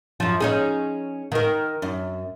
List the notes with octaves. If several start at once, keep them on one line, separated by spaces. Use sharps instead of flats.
F#2 F3
C#4 D#4 G#4
D#3 A#4
F#2